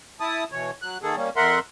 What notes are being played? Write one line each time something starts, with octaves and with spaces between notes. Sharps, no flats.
E4 A5 D#6
B2 E3 C#5
F#3 F#6
D#3 A#3 G#4 A4
G3 A#3 C#4
F2 A#4 E5 F#5 C6